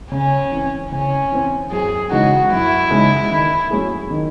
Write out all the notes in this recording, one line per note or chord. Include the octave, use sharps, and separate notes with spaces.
C#3 C#4
E3 C4
C#3 C#4
E3 C4
F#2 G#4
C#3 E3 G#3 D#4 F#4
F#2 E4
C#3 E3 G#3 D#4
D#3
F#3 A3 C#4 G#4
D#3